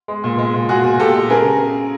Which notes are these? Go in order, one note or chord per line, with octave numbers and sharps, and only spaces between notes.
G#3
A#2
G#3
A#2
A#2 F#4 G#4
A#2
A#2 G4 A4
G#3
C#3 G#4 A#4